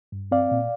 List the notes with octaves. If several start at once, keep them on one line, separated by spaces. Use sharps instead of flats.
G2
C4 D5 F5
A#2